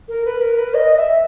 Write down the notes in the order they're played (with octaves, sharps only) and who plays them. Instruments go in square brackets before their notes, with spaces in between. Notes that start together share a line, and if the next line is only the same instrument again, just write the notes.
[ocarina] A#4
B4
A#4
B4
D#5
D#5
E5